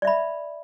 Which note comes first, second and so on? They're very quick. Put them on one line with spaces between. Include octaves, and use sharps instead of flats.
D5 E5 B5